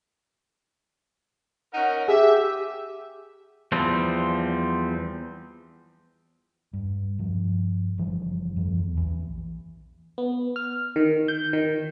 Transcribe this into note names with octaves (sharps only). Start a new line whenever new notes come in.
C#4 D#4 A#4 F#5
G4 G#4 E5
E2 F3 G3 C4
G2
G2 F3
F#1 E3 F3 G3
F#2 E3 F3
E2
A#1 E3
B3
F6
D#3
G6
D#3